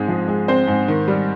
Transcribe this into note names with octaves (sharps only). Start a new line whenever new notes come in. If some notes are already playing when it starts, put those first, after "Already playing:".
Already playing: G#2 G#3 C4 G#4
F3
G#3
C4 C5
G#2
D#3
G3